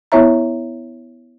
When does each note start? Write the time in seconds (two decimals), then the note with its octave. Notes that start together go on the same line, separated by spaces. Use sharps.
0.12 B3 E4 C#5 E5 A#5